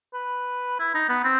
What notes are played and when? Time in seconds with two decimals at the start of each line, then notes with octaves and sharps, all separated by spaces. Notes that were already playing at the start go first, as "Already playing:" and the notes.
0.14 B4
0.80 E4
0.95 D#4
1.09 B3
1.24 C4